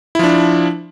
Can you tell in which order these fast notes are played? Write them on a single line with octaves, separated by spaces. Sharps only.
E4 F3 D4